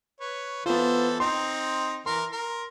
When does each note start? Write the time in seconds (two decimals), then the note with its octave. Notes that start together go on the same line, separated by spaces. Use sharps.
0.20 B4 C#5
0.66 E3 B3 F4 A4 C5
1.20 C4 D#4 C6
2.06 E3 A#4 C6
2.32 A#4